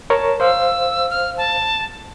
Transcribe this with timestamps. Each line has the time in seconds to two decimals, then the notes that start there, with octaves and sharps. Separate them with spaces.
0.10 A#4 C#5 A5
0.40 C5 F5 E6
1.10 F6
1.37 A5